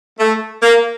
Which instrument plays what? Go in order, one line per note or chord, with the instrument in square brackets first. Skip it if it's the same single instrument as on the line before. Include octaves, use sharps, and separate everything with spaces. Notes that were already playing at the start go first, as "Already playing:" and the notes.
[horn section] A3
A#3